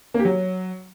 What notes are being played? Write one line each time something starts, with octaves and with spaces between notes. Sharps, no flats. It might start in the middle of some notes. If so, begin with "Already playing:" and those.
A#3
G4
F#3